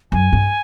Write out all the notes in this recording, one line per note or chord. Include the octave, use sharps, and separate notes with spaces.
F#2 G#5
G2